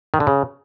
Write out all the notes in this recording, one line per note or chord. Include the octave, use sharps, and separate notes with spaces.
D#3
D3
C#3